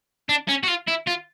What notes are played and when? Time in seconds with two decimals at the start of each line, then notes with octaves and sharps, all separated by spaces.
0.29 D4
0.49 C#4
0.64 F#4
0.68 F4
0.88 E4
1.07 F4